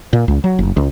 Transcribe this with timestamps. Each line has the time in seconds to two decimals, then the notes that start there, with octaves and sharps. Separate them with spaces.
0.13 A#2
0.28 C#2
0.44 F#3
0.59 F#1
0.77 C#2